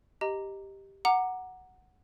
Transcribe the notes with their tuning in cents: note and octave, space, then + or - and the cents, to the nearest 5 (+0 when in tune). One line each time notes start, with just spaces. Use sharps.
G4 +0 D#5 +0 A#5 -5
F#5 +0 A#5 +0 D6 +20